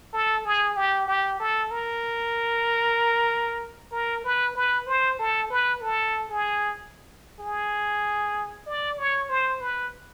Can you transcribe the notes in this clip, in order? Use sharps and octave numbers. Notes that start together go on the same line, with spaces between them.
A4
G#4
G4
G4
A4
A#4
A#4
B4
B4
C5
A4
B4
A4
G#4
G#4
D5
C#5
C5
B4